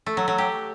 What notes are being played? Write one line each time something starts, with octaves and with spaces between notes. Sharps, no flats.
A3
F#3
F#3
G4